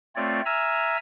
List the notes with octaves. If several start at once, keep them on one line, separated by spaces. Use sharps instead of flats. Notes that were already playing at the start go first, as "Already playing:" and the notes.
A3 C4 F4 C#5 D5
E5 G#5 A#5 E6 F6